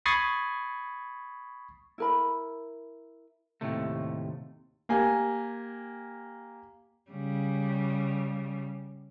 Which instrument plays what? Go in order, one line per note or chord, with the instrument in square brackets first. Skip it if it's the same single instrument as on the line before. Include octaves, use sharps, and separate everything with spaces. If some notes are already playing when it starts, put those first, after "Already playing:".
[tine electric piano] B5 C#6 D#6 G#6 A6 C7
[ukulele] E4 A#4 B5
[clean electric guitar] D#2 A2 C3 A3
[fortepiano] A#3 G4 G#5
[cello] C#3 G3